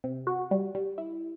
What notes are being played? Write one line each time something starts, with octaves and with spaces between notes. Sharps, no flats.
C3
F#4
G3
G3
E4